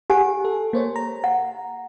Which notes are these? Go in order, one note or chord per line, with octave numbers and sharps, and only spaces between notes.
G4 F#5 G#5
A4
A#3 C5 C#5
A#5
F#5